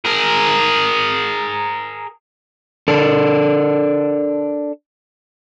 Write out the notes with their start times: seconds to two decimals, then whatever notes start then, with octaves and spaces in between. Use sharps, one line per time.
0.05 G#4 A#4
2.88 D4 A4 A#4